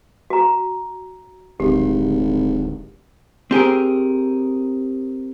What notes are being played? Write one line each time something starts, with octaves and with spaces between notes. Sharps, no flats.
F#4 A#5
D1 G#1 G4
C4 G4 G#4 A#4